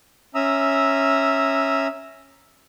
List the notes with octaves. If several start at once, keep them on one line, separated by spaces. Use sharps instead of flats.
C#4 E5 A#5 D#6 E6